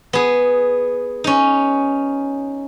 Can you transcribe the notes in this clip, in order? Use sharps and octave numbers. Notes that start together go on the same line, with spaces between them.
B3 G#4
C#4 D#4